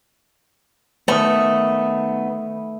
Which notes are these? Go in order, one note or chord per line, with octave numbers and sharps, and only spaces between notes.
D#3 A3 B3